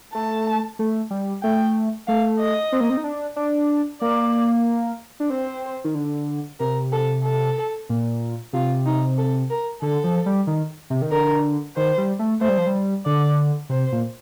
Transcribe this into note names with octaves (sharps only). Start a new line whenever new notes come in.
A3 A5
A3
G3
A3 G5
A3 F5
D#5
C4
A#3
C4
D#4
D4
D4
A#3 D5
D4
C4 C5
D#3
D3
C3 A#4
A4
A4
A#2
C3 F4
D#4
A4
A#4
D3 A4
F3
G3
D#3
C3
D#3
D3 A#4
D#3 C5
G3
A3
A3 C5
G3
F3
G3
D3 D5
C3 C5
A#2